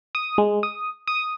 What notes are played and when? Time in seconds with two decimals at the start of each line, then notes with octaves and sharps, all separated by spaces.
0.15 D#6
0.38 G#3
0.63 D#6
1.08 D#6